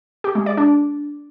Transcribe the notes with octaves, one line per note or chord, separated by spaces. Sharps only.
G4
G#3
D5
D4